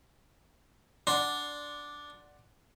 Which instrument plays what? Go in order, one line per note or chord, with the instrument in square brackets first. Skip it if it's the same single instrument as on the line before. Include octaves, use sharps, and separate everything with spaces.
[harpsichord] D4 [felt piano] D5 F#5 C6